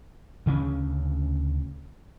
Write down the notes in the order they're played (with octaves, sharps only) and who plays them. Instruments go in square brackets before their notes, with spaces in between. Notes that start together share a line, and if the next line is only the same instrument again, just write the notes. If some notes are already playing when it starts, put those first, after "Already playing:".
[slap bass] D2 C#3 G#3 C#4